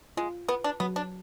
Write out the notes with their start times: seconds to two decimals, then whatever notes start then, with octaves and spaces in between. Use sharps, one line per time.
0.17 G#3 F4
0.48 B3 B4
0.64 D4
0.80 F#3 B3
0.96 D4